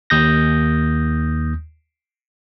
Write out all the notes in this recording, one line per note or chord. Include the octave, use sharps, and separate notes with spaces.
D#2 D#6 G6 A#6